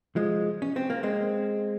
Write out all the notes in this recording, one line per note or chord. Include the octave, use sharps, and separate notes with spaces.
F3 G#3
C#4
C4
A#3
G#3 C4